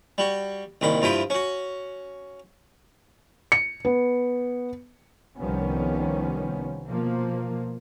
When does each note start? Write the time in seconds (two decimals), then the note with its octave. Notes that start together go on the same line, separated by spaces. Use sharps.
0.18 G3 F#4
0.81 C2 A#2 D#3 B5
1.02 G2 F3 E4 G4 B5
1.30 C#4 F#4
3.52 C#7
3.85 B3
5.38 C2 D#3 F3 G3 B3 C#4
6.89 B2 F3 A#3